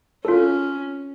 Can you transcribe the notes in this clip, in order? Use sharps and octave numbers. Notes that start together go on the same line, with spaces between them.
C#4 F4 A4